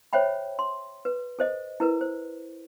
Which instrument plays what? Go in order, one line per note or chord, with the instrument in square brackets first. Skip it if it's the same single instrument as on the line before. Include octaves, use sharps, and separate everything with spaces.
[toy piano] C5 C#5 E5 G5 B5
C6
B4
A4 C5 D#5
E4 A#4 B4
C5